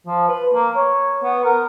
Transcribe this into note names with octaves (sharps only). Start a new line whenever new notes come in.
F3
B4
A#3
C#5
B3
A#4